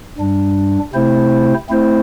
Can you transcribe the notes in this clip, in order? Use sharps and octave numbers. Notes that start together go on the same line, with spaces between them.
G2 G3 D4
C3 A3 C4 E4 C5
A3 C4 E4 C5